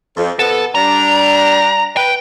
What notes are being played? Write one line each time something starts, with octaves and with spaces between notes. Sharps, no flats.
F2
B2 F3 B3 A4
G3 D4 A#5
B4 G5